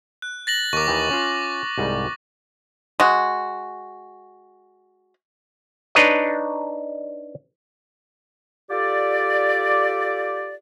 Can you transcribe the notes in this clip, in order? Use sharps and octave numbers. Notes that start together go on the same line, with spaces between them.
F#6
A6 A#6 F#7
D#2 A#4 C#6 D6
D#2 D#3 E3
C#4 F4
C2 G#2 G3
G#3 F#4
D4 D#4 B4 C#5 D#5
F4 G4 A4 D5